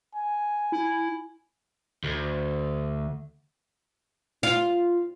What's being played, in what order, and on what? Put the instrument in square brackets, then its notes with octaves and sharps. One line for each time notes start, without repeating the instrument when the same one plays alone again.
[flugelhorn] G#5
[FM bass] E4
[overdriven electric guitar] D2
[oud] F4